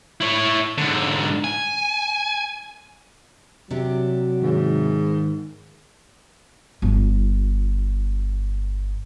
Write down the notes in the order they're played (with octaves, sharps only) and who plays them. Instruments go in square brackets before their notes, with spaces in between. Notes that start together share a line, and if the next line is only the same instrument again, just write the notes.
[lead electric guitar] E4 C#5
G#2 D3
G#5
[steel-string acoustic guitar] C3 D4 G4 [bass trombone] F#3
[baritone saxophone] G#2 [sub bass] D#3
[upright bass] G1 F4